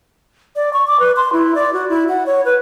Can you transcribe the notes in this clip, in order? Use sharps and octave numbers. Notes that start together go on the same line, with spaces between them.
D5
C#6
D6
B4
C6
E4
D5
F#4
E4
F#5
C#5
B4